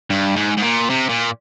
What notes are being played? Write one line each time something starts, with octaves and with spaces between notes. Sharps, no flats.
G2
G#2
G#2
A#2
C3
A#2